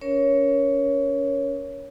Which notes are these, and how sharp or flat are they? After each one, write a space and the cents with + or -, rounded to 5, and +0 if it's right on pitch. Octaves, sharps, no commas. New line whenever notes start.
C#4 +25 A#4 +20 C#5 +0